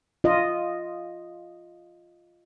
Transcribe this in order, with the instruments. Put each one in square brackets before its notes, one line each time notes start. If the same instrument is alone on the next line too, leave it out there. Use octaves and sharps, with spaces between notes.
[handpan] F4 D#5